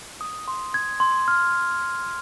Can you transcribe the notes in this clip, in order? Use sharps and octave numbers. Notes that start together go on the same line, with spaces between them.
D#6
C6
G#6
C6
F6